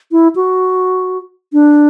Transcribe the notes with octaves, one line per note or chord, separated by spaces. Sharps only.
E4
F#4
D4